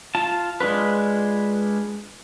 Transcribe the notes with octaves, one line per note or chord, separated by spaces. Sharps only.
F4 A5
G#3 D4 F4 B4